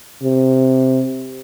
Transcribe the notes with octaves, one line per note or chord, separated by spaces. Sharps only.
C3